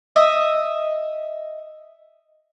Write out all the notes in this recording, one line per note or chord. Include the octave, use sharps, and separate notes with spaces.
D#5 E5 D#6